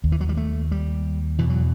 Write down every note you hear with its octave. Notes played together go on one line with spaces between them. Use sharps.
D#2
E3
F#3
G3
A3
G3
E2 B2 E3
F#3